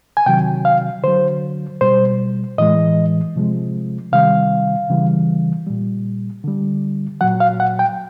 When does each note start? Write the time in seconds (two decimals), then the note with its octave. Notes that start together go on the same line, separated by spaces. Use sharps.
0.17 G#5
0.26 C3 D#3 F#3 G5
0.65 F5
1.04 D3 F#3 C5
1.81 B2 G3 C5
2.58 A2 E3 G#3 D#5
3.36 C3 F3 G#3
4.13 C3 D#3 G3 F5
4.90 C#3 E3 G3
5.67 A#2 G3
6.44 D3 G3
7.21 A#2 F#3 F#5
7.40 F5
7.60 F#5
7.79 G5